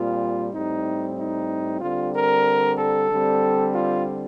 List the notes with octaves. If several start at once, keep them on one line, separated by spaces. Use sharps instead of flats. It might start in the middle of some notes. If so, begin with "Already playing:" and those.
Already playing: A#2 G3 C4 F4
A2 G3 C4 D#4
D#4
D3 G3 C4 F4
A#4
A4
D3 G3 C4
F4